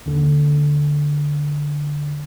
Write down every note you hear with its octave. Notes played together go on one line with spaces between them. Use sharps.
D#2 D3